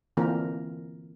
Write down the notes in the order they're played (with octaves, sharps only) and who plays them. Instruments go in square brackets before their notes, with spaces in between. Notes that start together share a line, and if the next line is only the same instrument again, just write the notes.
[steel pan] D3 E3 A#3 C4 F4 A#4